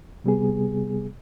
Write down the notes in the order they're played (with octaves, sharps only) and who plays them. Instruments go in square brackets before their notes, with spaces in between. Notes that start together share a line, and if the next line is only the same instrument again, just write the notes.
[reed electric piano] C3 G3 B3 G#4